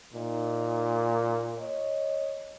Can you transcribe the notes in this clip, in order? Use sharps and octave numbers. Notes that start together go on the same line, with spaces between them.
A#2 D#4
C#5 D#5